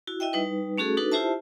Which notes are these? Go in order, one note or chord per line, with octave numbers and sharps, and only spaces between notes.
E4 F#4
E4 D#5 E5 G5
G3 D#4 B4
A3 C#4 F#4 G#4 A4
D4 D#4 F#4 A4 B4
E4 F4 G4 C5 E5 A5